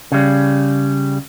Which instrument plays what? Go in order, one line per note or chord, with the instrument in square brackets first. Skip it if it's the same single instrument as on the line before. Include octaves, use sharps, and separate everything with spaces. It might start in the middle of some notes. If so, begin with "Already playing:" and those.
[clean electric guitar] C#3 G3